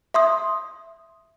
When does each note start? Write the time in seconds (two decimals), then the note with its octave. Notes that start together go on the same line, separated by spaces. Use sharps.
0.14 E5 C6 D#6